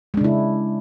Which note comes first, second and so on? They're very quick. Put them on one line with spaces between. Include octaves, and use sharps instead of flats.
G#3 D4 C#3 E4